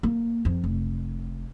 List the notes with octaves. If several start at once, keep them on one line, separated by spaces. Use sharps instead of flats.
A#3
F2
F1